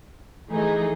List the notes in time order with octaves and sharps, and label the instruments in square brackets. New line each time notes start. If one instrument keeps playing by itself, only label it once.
[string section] E3 A3 D#4 G#4